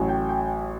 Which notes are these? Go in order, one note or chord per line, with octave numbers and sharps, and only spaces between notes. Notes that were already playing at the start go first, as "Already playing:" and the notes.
Already playing: A1 A2 F#3
G5
G5